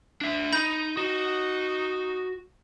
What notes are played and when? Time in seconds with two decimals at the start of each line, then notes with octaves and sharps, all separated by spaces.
0.21 D4 E5
0.53 D#4 B5 G6
0.97 D#4 F#4